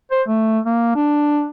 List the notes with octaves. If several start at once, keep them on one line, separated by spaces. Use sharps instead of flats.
C5
A3
A#3
D4